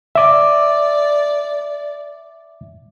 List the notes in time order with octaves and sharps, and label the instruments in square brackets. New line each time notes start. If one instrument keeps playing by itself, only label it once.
[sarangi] D5 [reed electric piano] E5 D6